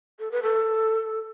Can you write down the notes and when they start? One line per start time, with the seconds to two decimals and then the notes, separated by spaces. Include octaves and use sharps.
0.19 A4
0.32 B4
0.43 A4